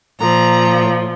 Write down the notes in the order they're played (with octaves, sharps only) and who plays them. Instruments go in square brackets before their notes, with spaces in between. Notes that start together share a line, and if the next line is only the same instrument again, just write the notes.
[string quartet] A#2 F3 A#5